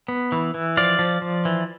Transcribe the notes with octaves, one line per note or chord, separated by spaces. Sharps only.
B3
E3
E3
F3 D5 F5
F3
F3
E3